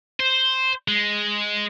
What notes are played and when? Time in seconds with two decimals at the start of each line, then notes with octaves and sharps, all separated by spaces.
0.20 C5
0.88 G#3